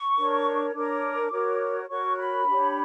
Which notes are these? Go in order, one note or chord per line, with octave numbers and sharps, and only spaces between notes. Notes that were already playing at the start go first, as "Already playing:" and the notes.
Already playing: C#6
D4 A#4 C#5
D4 A#4 C#5 D6
F#4 A#4 C#5
F#4 A#4 C#5 C#6
B5
D4 G4 C#5